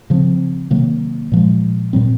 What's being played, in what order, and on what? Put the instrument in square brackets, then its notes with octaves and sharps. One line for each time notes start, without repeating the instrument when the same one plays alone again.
[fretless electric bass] C#3 F3 C4
C3 D#3 F#3 A#3
A#2 F3 G#3
A#2 F#3 C4